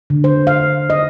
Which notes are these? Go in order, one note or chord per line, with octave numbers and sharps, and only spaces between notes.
D3
C5
F5
D#5